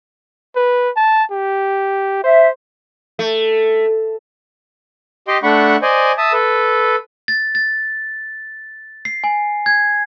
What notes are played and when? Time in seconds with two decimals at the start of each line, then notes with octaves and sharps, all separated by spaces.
0.56 B4
0.97 A5
1.31 G4
2.24 C5 E5
3.19 A3
5.28 G4 D#5 G5 C6
5.43 A3 D4 F#5 B5 C#6
5.82 C5 D5 D#5 G#5
6.18 E5 A5 D#6
6.33 A4 B4
7.28 A6
7.55 A6
9.05 C7
9.24 G#5
9.66 G#6